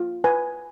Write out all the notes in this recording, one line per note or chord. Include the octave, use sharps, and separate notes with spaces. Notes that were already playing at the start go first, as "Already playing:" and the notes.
Already playing: F4
B4 G#5